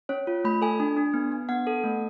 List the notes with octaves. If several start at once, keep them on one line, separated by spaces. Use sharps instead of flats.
C#4 C#5
F4
A3 B5
A4 G#5
D4
D4
B3
B3
B3 F#5
A4
A3